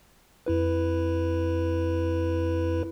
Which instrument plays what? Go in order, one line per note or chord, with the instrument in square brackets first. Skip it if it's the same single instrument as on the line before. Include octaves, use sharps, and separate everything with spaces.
[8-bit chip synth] F2 E4 B4